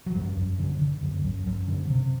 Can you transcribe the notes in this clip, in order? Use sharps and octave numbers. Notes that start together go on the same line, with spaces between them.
F#3
F#2 G3
F#2
D3
D3
F#2
F#2
F#2
D3
C3